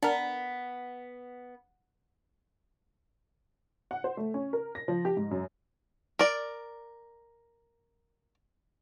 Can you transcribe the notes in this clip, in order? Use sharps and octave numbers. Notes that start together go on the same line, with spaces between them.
B3 D4 A#4
F#5
C5
A3
C#4
A#4
A#6
F3
G4
G#2
F#2
A#4 D5